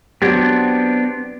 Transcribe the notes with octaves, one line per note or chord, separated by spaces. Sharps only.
F#3 B3 C4 D4 G4 G#6